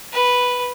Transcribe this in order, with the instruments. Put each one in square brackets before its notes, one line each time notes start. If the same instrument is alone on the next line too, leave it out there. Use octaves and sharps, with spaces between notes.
[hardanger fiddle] B4